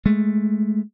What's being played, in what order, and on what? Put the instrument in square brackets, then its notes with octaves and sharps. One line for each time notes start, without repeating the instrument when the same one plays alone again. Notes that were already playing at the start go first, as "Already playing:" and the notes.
[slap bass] G#3 A3